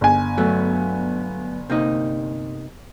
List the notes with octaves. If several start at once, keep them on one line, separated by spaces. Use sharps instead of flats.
G1 G#5
F#3 A3 B3
C3 A#3 D#4